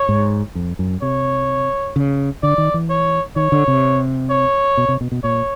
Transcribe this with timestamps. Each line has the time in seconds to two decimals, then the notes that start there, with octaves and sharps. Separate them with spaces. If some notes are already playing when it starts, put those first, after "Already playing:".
Already playing: C#5
0.09 G#2
0.55 F2
0.79 F#2
1.02 C3 C#5
1.96 C#3
2.43 D3 D5
2.58 D#3
2.74 E3
2.90 C#5
3.36 D#3 C#5
3.52 D3
3.68 C3
4.30 C#5
4.77 B2
4.89 C3
5.01 B2
5.12 B2
5.24 A#2 C#5